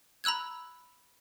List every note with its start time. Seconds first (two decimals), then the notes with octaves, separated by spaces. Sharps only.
0.24 A#5 B5 E6 F#6 G#6